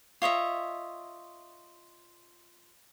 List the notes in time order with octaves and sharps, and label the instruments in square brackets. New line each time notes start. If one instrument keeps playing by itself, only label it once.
[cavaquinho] F4 C#5 D#5 E5